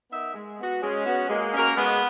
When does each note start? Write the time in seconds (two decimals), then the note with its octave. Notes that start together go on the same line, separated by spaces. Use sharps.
0.11 B3 D#4 A#4 E5
0.34 G#3
0.59 B3 F#4
0.82 G#3 C#4
1.06 B3 F#4
1.29 G#3 A#3
1.54 C#4 F#4 A#4 C#5
1.77 G#3 B3